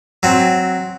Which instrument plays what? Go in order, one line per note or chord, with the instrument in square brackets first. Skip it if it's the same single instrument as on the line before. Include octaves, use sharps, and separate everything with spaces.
[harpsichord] F#3 C4